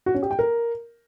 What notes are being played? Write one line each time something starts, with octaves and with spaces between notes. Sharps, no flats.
F#4
C#4
G4
G5
A#4